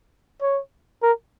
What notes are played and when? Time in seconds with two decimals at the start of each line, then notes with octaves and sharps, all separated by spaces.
0.42 C#5
1.03 A#4